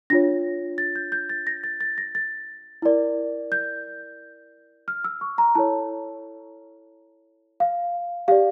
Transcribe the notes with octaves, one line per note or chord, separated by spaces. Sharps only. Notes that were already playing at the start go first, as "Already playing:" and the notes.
D4 F4 C#5 A#6
A6
G6
G6
A6
A#6
A6
A6
A#6
A6
E4 A#4 D5
G6
F6
E6
C#6
A#5
E4 A4 C#5 A5
F5
G4 D5 F5